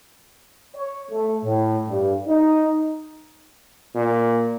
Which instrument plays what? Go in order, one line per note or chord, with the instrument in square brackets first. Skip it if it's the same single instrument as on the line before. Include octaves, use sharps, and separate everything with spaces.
[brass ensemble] C#5
A3
A2
G2
D#4
[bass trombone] A#2